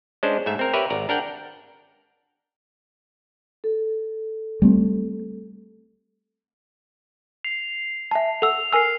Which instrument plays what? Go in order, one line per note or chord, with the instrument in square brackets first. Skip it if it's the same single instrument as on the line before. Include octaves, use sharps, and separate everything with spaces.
[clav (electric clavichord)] G#3 C#4 D4 C5
G#2 A3 E5
C4 A#4
G4 A#4 B4 C#5 E5
G#1 D5 A#5
D4 A#4 F#5 G5
[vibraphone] A4
[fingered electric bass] G3 A3 C4
[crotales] C7 F7
[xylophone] E5 G#5 A5
[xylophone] A4 F#5 E6 [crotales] F7
[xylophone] A#4 G#5 E6 [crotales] F6 C7